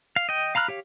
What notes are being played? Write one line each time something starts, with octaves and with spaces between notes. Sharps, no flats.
F5
D#5 G5
F5 A#5 B5 F6 F#6
G4 C#5 F5